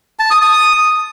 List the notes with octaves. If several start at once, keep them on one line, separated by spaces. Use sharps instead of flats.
A5
D#6
D#6